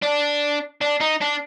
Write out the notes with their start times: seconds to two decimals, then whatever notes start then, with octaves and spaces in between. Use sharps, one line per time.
0.02 D4
0.81 D4
1.01 D#4
1.21 D4